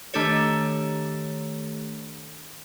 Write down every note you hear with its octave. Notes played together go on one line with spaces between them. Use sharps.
D#3 A3 D4 G4 A4 C#5